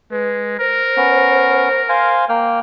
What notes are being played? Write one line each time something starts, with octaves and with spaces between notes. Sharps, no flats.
G#3 B4
A#4 C5
B3 C#4
C5 F5 G#5
A#3 G5 F6